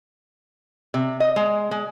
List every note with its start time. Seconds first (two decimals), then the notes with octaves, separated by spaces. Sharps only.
0.94 C3
1.20 D#5
1.36 G#3
1.71 G#3